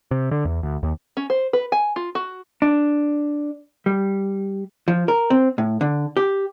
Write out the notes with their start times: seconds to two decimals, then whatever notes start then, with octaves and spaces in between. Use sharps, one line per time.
0.11 C3
0.31 D3
0.45 E2
0.63 D2
0.83 D#2
1.17 C#4
1.30 C5
1.53 B4
1.72 G#5
1.96 F4
2.15 F#4
2.62 D4
3.86 G3
4.88 F3
5.08 A#4
5.30 C4
5.58 A2
5.81 D3
6.17 G4